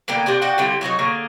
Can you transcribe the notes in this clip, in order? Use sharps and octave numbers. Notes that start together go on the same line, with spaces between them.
D3 A#3 B3 G5
C4 D4 G4 D5
F#4 D5 F#5 G5
D3 G3 C4 E4
F#3 D#4 F#4 C#5
D3 A#3 G#4